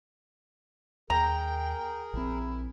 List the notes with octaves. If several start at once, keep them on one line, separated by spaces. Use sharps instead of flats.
D#2 G#4 A#4 G5 A#5
A#1 C4 E4